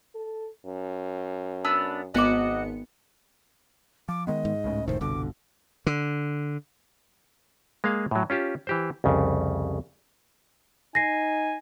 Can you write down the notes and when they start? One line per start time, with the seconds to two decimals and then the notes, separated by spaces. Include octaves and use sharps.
0.15 A4
0.65 F#2
1.65 B3 D4 E6
2.15 G#1 B3 F#4 D#5 D6 C#7
4.09 F3 D6
4.27 D#3 G#3 B3 D#5
4.45 G#2
4.64 C#2 A2 C#3
4.88 F1 C#2 A2 D#3 C5
5.01 G1 C2 G2 B2 D3 D6
5.86 D3
7.84 G#3 A#3 G#4 F5
8.11 A2 F#3
8.30 C#4 F4 G4 A5
8.67 E3 G4 C5
9.04 C2 F2 C#3
10.95 D#4 G#5 A#6 C7